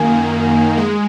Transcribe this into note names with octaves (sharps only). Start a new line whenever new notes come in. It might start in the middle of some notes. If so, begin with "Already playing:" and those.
Already playing: F#2 D#3 A#3 G#5
G#3